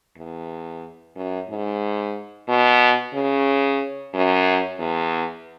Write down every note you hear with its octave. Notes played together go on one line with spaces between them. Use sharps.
E2
F#2
G#2
B2
C#3
F#2
E2